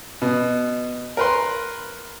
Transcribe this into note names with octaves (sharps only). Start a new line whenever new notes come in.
B2
A#4 B4 C6